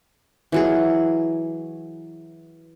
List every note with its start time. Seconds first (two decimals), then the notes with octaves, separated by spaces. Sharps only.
0.52 E3 F#3 G#4